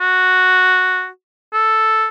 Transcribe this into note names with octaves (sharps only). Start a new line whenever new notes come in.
F#4
A4